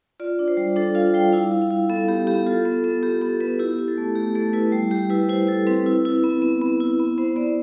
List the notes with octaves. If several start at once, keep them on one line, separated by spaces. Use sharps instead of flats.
F4 D5
D4
C5
G3
D4 A4
F4 F5
G3 G5
E4 F5
E4
F5
E4
B3 A4
B3 G4
B3 G4
F4 A4
B3 A4
B3 A4
B3 G4
B3 A4
B3 B4
E4 G4
E4
A4
A3
A3 G4
A3 A4
E4 B4
G3
G3 G4
E4 B4
E4 C5
E4 A4
C4 B4
E4
E4
B3
B3
B3
E4
B3
B3 C5
B3 D5